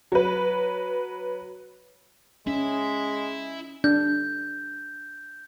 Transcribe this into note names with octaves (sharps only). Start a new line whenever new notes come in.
F#3 B4
G#3 C#4 E4 E5
D4 G6